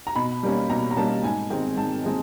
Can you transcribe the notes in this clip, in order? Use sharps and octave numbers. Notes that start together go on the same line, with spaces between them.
A#5
B2 B5
G3 A#3 C#4
B2 A#5
A#5
G3 A#3 C#4 A5
G#2 G#5
D#3 G#3 C4 G5
G#2 A5
D#3 G#3 C4